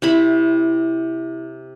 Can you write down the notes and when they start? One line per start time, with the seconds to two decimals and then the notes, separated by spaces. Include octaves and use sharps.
0.02 C3 E4 B5